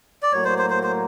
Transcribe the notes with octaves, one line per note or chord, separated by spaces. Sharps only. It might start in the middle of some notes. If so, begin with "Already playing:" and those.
D5
A2 F#3 A#3 C#5
C5
C5
C5
C5